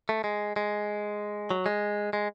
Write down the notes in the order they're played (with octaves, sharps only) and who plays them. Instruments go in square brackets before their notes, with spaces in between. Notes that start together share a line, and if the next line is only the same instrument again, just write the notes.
[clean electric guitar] A3
G#3
G#3
F#3
G#3
G#3